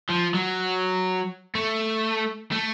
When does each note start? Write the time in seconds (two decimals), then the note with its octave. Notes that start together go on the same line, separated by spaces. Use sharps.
0.09 F3
0.34 F#3
1.55 A3
2.52 A3